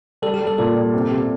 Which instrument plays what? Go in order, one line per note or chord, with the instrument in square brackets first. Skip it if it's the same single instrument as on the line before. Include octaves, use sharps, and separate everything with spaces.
[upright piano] G3 [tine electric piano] A4
[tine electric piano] G4
[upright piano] G3
[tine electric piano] A4
[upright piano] A#2 [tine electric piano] A4
[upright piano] G3
C3
C3